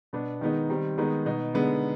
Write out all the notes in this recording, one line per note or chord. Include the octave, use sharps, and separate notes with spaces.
B2 B3 D4
D#3 G#3 B3 D#4
D#3 G3 C4
D#3 G#3 B3 D#4
B2 B3 D#4
D3 G#3 B3 D#4